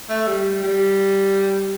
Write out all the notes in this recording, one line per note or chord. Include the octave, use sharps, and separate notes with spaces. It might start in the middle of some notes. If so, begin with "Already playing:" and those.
A3
G3
G3